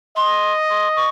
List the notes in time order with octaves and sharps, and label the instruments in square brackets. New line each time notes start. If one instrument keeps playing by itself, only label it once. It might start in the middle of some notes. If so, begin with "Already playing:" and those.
[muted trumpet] D#5 [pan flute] C6
[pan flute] C6
C#6